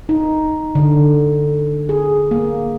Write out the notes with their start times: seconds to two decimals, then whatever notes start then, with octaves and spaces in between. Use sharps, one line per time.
0.09 D#4
0.75 D3
1.89 G#4
2.31 A#3